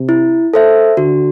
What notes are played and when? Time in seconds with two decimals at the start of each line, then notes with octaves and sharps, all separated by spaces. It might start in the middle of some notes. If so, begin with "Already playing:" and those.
Already playing: C3
0.09 E4
0.54 A4 C5 E5
0.97 D3 F#4